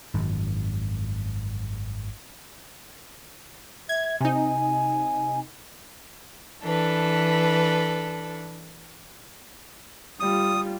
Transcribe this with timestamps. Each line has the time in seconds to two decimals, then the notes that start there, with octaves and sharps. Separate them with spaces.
0.14 G#1 F#2
3.89 E5 G#6
4.21 C3 D#4 G#5
6.63 E3 D4 A4 B4
10.20 G3 F4 D#6